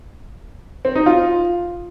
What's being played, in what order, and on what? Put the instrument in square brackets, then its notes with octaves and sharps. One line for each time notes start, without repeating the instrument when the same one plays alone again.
[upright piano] C4
D#4
F4